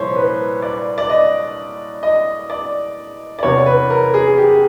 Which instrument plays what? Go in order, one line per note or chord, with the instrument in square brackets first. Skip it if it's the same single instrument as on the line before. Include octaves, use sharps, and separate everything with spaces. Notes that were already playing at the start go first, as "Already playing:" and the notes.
Already playing: [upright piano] C2 A#2 F3 C5 C#5
B4
D5
D5
D#5
D#5
D5
D5
E2 C3 E3 C#5
B4
A#4
G#4
G4